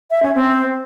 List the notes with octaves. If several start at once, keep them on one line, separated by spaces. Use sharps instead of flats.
E5
C#4
C4